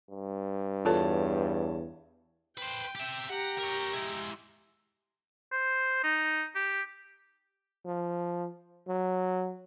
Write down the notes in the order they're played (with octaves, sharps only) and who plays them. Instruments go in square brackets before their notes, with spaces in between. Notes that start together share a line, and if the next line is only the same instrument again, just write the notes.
[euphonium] G2
[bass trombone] E2 [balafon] F4 A4 [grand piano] C#5 A5
[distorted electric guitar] B4 C5 [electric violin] G5
[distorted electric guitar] G4 E5
[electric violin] G4 A#5 [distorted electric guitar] F#5
[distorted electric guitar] A#4 C#5
G#3 E4
[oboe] C5
D#4
G4
[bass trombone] F3
F#3